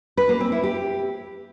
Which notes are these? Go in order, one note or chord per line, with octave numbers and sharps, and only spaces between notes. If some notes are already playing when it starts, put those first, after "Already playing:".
B4
A#3
C4
E4
G4